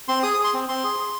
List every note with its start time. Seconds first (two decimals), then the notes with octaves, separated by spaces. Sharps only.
0.08 C4 C6
0.23 G#4 D#6
0.34 D#6
0.39 G#4
0.44 C6
0.54 C4
0.69 C4 C6
0.84 G#4
0.99 G#4